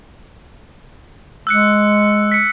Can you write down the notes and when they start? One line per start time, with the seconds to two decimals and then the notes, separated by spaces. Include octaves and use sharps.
1.47 G#3 E6 F#6 C#7
2.32 B6 C#7